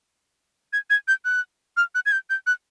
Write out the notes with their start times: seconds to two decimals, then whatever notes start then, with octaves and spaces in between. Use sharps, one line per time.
0.73 G#6
0.90 G#6
1.08 G6
1.25 F#6
1.77 F6
1.95 F#6
2.06 G#6
2.12 G6
2.30 G6
2.47 F#6